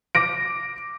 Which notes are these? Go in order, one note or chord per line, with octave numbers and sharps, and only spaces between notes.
D6 A#6 D7